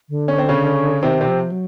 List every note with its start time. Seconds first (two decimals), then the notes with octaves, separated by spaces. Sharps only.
0.09 D3
0.28 C#4
0.38 C4
0.49 C#3 C#4
1.03 C3 D#3 C4
1.21 C3 C4
1.28 F3
1.52 F#3